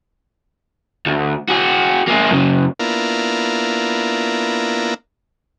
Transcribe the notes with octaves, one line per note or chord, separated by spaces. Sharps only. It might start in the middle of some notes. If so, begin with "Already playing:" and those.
D2
F#4 G#4
A#3 G#4
F#2 C#3
A#3 B3 D4 E4 F4 A#4